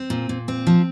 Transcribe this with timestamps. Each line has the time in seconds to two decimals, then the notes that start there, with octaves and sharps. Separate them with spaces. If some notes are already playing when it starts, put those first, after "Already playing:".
Already playing: C4
0.10 A#2
0.29 A#2
0.48 C4
0.67 F3